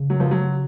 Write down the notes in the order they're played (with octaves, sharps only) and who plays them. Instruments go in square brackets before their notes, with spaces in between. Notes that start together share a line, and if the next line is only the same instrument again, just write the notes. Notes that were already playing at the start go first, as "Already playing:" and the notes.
Already playing: [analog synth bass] C#3
[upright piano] F#3
F3
F#3